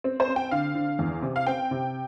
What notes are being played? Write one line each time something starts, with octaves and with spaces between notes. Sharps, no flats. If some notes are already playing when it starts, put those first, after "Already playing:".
C4
C5
C4
G5
D3 F5
D3
E2
C3
F5
C4 G5
C3